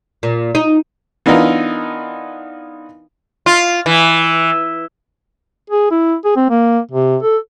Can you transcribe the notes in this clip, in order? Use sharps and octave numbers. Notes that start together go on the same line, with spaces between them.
A#2
D#4
E3 B3 D4 D#4 F4 A#4
F4
E3
G#4
E4
G#4
C4
A#3
C3
A4